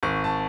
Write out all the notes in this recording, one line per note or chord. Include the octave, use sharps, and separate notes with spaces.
G#1 C#6
A5